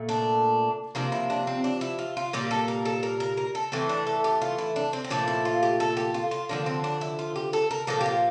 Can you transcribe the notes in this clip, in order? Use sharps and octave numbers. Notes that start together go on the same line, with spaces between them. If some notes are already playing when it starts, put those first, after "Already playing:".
Already playing: A#2 A3
D4
C3 F3 A#3 D4
E4
D4
C4
D4
E4
F4
F4
A#2 G3 A#3 G4
A4
A#4
A4
A#4
A#4
A#4
A4
A2 E3 A3 C4
D4
A4
G4
F4
E4
D4
C4
C4
A#2 F3 A3 D4
E4
F4
G4
A4
G4
F4
F4
D3 F3 A#3 D4
C4
D4
E4
F4
G4
A4
A#4
A#2 F3 A#3 A4
G4
F4